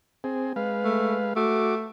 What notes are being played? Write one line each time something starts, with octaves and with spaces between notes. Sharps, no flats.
C4 G#4
G#3 B4 F5
A3
A3 F#4 D6